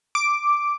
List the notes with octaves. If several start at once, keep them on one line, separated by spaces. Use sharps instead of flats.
D6